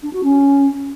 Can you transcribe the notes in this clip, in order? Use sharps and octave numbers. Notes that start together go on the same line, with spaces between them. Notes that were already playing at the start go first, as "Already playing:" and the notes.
D4
F#4
C#4